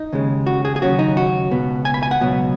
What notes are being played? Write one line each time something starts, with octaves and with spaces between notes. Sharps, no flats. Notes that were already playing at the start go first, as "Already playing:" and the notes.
Already playing: D#4
D#2 C#3 G#3
F#4
G#4
G#4
D#2 C#3 F#3 C#4 F#4
D#4
F#4
C#2 B2 B3
G#5
B5
G#5
F#5
C#2 B2 F#3 B3